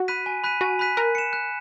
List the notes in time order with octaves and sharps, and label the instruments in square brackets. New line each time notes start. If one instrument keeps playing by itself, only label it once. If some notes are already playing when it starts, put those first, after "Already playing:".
Already playing: [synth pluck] F#4
[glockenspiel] B5 F#6 B6 D#7
G#5
B5 F#6 B6 D#7
[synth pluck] F#4 [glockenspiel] G#5
[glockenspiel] B5 F#6 B6 D#7
[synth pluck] A#4 [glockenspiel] F#6
[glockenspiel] C#7 E7
F#6